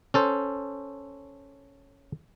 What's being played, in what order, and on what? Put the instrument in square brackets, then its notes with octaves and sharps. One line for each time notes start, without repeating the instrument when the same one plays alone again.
[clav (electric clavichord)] C#4 A4 C5